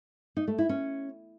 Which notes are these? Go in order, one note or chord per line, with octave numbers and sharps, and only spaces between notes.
D#4
A3
E4
C#4